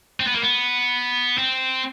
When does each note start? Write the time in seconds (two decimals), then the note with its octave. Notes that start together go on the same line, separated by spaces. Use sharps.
0.20 C4
0.27 B3
0.34 A#3
0.42 B3
1.38 C4